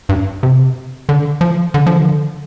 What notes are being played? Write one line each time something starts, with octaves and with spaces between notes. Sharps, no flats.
G2
C3
D3
F3
D3
F3
D3